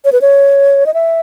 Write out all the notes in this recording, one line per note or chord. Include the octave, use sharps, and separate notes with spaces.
C#5
B4
C#5
D#5
E5